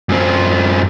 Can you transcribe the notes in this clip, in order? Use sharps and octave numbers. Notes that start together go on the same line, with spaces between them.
F#2 C4